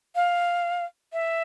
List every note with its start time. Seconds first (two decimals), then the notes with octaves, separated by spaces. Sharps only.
0.15 F5
1.13 E5